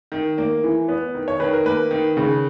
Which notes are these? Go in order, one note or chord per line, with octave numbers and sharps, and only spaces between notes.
D#3
A#3
E3
B3
D#3
C#5
D#3 B4
A#4
A#3 B4
D#3
C#3